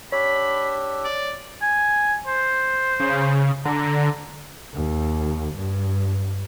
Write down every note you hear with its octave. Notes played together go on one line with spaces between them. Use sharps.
D4 G4 C#5 B5 E6
D5
G#5
C5
C#3
D3 A#5
D#2
G2